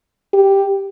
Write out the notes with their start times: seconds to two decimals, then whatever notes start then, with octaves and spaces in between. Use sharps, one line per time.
0.34 G4